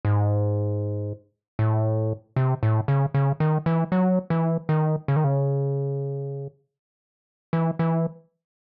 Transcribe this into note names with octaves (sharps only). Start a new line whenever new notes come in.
G#2
A2
C3
A2
C#3
C#3
D#3
E3
F#3
E3
D#3
C#3
D#3
C#3
E3
E3